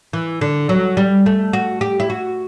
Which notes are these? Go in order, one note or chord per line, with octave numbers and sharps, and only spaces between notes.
E3
D3
F#3
G3
A3
F#4
G4
E4
F#4